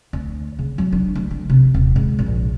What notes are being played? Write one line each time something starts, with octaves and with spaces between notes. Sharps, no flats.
D2
C#3
F#3
D4
D2
D3
C3
D#1
G#2
A#1